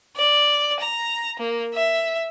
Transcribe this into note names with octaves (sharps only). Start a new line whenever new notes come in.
D5
A#5
A#3
E5